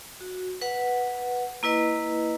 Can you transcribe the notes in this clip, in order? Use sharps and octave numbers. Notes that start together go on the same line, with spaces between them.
F#4
B4 F#5
A#3 E4 B4 D#5